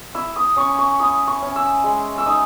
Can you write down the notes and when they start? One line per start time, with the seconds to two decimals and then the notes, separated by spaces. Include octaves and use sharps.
0.15 E4 E6
0.36 D#6
0.56 C#4 C#6
0.78 C#6
1.00 E4 D#6
1.27 C#6
1.42 C#4
1.56 E6
1.84 G#3
2.18 E6
2.26 D#4 D#6